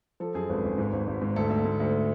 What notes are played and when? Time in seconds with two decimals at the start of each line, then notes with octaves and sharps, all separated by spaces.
0.20 F3 A4
0.34 F#2 G#4
0.49 G#1 B4
0.64 G#1
0.78 G#2
0.93 G#1
1.08 G#1
1.21 G#2
1.36 D2 A4
1.50 D2
1.65 D2
1.80 D2